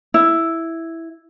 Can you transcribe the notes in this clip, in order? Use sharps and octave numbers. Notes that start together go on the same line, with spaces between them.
E4